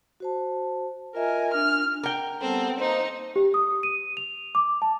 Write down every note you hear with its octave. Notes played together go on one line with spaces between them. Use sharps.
F#4 C5 A5
F4 A#4 D#5 E5 G#5
D4 F6
A#4 G5
G3 B3 C4 A4
A#3 D#4 C5 D#5
G4
D#6
D#7
F7
D6
A5